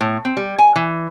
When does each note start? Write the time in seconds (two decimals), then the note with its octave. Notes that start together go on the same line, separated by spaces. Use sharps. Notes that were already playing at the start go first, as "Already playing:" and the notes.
0.01 A2
0.25 C4
0.37 G3
0.58 G#5
0.76 E3